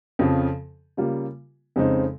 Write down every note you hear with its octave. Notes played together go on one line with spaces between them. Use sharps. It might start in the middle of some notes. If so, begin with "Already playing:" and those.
F2 C#3 F3
C#3 G3 A#3 F4
F2 C#3 G#3 C4 D#4